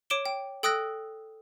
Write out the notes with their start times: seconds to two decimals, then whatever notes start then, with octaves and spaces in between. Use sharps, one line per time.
0.10 C#5 D6 D7 E7 G7
0.26 G5
0.63 A4 G5 D#6 E6 F#6 A#6